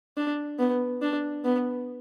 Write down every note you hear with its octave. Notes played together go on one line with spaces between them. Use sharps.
D4
B3
D4
B3